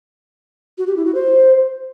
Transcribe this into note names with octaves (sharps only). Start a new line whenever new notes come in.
F#4
G4
E4
F#4
C5